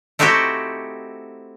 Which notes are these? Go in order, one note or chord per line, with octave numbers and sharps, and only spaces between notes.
A3 C4 D#4 E4 F#4 G4